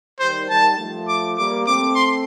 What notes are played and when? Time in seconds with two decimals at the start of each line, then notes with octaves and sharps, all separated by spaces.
0.19 D#3 G3 C5
0.49 D#3 G3 A5
0.78 F3 A3
1.08 D6
1.37 G3 A#3 D6
1.66 A3 C4 D6
1.95 C6